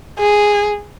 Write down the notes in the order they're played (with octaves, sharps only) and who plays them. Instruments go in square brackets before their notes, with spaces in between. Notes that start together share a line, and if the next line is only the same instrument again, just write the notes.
[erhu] G#4